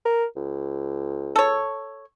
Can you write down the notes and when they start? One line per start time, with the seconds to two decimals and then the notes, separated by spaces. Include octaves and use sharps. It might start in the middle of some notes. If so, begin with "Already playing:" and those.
0.05 A#4
0.36 C#2
1.36 A4 C#5